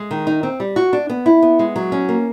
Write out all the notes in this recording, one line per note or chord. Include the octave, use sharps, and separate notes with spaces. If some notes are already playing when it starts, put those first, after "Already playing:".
Already playing: G#3
D#3
D#4
C4
G3
F#4
D4
B3
E4
B3
G#3
F#3
C#4
A#3